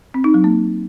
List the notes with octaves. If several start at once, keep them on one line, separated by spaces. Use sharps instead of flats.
C4
D#4
F#3
A#3